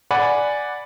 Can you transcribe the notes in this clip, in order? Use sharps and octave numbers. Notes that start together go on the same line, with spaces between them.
D5 F#5 G#5 B5